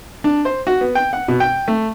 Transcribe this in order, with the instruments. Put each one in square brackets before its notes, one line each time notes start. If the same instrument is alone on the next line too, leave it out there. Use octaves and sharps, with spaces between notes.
[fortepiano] D4
C5
F#4
B3
G5
F#5
B2
G5
A3